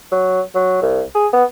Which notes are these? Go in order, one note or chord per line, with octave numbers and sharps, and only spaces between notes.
F#3
F#3
C2
G#4
B3